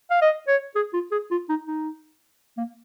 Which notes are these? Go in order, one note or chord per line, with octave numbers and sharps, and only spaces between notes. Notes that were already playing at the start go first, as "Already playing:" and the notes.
F5
D#5
C#5
G#4
F4
G#4
F4
D#4
D#4
A#3